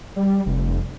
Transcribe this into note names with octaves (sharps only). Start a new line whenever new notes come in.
G3
F1